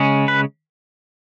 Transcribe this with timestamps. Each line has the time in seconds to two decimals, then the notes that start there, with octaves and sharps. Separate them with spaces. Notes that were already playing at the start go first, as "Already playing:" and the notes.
Already playing: C#3 G#3 C#4
0.28 B4